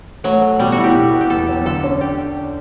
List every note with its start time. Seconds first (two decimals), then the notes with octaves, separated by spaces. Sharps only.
0.24 F#3 A3
0.42 A4
0.59 B2 G3
0.72 F#4
0.78 E4
0.84 G4
0.95 B2
1.13 B3
1.21 G4
1.30 E2 A4
1.48 F#3
1.66 D3 A4
1.84 C#4
2.01 G4